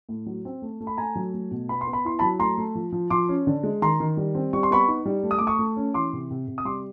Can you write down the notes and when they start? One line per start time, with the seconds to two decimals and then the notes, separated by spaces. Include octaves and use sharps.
0.09 A2
0.26 F#3
0.45 C4
0.62 A3
0.80 A3
0.87 B5
0.97 A3 G#5 A#5
1.16 F#3
1.34 A3
1.51 B2
1.69 B3 B5
1.81 C6
1.87 B3
1.93 B5
2.05 E4 C6
2.19 F#3 A5 B5
2.39 A3 A#5 C6
2.58 A3
2.75 F3
2.92 F3
3.10 F3 C6 D6
3.29 C#4
3.47 D3
3.63 G#3
3.82 D#3 A#5 C6
4.00 D#3
4.17 G3
4.35 C4
4.53 G3 C#6
4.63 C6
4.71 B3 B5 C#6
4.88 D#4
5.06 G3
5.23 A3
5.31 D#6
5.38 A3 D6
5.47 C#6 D#6
5.59 A3
5.77 C#4
5.94 E3 C6 D6
6.13 C3
6.31 C3
6.48 C3
6.58 D#6
6.65 G3 C6 D6